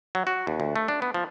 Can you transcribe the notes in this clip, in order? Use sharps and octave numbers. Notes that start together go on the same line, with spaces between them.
F#3
F#4
D#2
D2
A3
D4
B3
F3